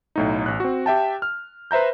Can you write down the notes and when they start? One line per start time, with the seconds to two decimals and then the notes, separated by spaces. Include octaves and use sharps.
0.16 B1 A2 D#4
0.46 A1 F#6
0.60 C4 F#4
0.86 G4 E5 G5 A5
1.22 F6
1.71 B4 C5 E5 A#5 G6